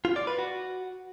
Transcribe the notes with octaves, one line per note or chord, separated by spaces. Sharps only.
F4
D5
B4
F#4